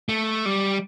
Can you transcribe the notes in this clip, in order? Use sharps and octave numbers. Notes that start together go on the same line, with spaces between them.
A3
G3